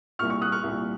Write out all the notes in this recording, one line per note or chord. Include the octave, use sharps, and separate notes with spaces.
C2 A#2 C#6 F6
C#6 F6
D#6 F#6
C#6 F6
C2 A#2